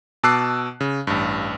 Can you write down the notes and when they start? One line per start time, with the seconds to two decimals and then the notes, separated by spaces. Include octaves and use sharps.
0.23 B2 A5 D6 E6 F#6 C7
0.81 C#3
1.07 A1 G2